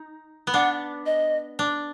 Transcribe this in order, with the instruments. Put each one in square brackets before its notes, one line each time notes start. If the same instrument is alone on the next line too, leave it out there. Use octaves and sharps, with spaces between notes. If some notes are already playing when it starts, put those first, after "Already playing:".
Already playing: [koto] D#4
B3
[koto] D4 [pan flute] F#5
[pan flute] D#5
[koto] D4